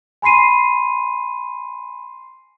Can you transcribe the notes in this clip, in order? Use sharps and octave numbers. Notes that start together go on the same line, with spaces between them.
G#5 B5 C6 C7 D#7